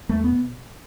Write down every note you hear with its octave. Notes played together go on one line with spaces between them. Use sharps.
E2 A3
B3
B2